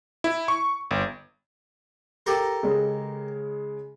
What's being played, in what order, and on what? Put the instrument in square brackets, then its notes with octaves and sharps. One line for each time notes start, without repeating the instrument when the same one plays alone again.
[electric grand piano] E4
C#6
G1
[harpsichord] G4 A4 A#4
[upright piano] C#3 G#3